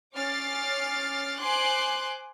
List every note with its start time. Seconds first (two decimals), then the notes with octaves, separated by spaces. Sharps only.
0.15 C#4 D6 F6 A6 C7
1.37 C5 G#5 C6 D6 F#6